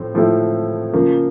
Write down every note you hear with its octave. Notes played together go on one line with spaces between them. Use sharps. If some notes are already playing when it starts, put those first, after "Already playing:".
Already playing: A2 F3 C4
A2 F3 A3 C4 E4
C#3 F3 A#3